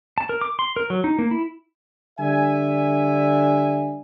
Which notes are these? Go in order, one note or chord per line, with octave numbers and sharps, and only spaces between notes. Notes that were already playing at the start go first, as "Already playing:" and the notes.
A5
A#4
D6
C6
A#4
F#3
D#4
A#3
E4
D3 G3 D5 E5 G#5